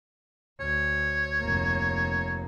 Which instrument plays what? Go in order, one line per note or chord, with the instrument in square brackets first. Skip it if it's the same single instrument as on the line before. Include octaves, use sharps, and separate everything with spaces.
[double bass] D2 [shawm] C#5
[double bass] F1 A#3